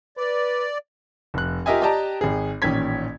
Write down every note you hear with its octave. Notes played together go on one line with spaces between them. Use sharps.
B4 D5
F1 F#6
F4 G4 A#4 D#5 E5 G#5
G4 D5 D#5 G5 A5 A#5
G#1 G#4
A1 A#2 D#3 C#4 G#6 B6